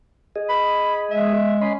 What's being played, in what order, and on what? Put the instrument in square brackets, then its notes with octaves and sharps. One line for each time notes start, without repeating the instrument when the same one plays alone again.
[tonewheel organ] G#4 D#5
[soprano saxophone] B5
[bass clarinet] G#3 [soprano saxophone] E5
[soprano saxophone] C#4 [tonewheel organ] D#5 B5 C6